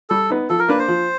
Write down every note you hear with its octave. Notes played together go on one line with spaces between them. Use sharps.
G3 A4
B3 D#4
F3 A4
A#4
A#3 D4 B4
C5
F3